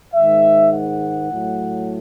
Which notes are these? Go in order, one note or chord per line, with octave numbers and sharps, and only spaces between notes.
G#2 D#3 G#3 E5
F#5
A2 F#3 A3